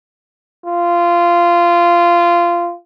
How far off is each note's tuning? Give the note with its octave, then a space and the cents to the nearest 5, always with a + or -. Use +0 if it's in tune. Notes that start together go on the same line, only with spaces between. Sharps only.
F4 -15